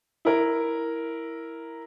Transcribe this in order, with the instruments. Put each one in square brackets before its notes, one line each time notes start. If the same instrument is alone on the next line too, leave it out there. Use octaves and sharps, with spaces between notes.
[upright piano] E4 A#4